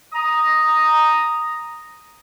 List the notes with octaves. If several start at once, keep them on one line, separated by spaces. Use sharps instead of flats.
A#5 D#6